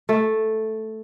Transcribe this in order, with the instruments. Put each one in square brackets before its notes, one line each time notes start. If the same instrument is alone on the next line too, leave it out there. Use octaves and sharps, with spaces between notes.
[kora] A3